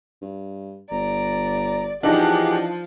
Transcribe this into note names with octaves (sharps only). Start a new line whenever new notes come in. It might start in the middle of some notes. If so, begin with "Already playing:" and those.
G2
G1 D5 A#5
E3 F3 D4 D#4 G4 G#4 F#5